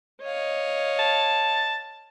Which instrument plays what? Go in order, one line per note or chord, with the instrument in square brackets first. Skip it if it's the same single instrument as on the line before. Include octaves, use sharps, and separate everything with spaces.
[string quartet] C#5 D#5 F5
[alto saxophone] A5